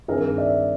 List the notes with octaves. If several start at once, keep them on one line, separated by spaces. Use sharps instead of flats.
G2 D#3 G3 C4 D#4 G#4 A#4
D5 E5